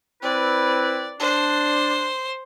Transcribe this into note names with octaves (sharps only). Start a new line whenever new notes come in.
C4 E4 B4 D5
D4 C5